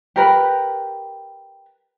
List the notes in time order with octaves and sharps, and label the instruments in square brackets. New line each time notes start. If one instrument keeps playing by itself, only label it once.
[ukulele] G4 A#4 B4